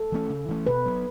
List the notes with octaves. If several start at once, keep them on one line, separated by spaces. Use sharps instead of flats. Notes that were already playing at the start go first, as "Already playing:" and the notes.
Already playing: A4
E3 A3 C#4
C#3
E3 A3 C#4
B2 B4
F#3 B3